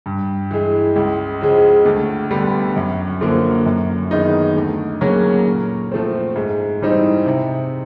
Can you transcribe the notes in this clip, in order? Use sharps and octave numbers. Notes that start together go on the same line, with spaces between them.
G2
E3 G#3
C#2
C#3 F3 G#3
D2
D3 G3 B3
F#2
D3 F3 A#3
F#2
D#3 G#3 B3 D#4
D2
C#3 F#3 A#3 C#4
A#2
F3 A3 C4
G#2
E3 G3 C4 D#4
C3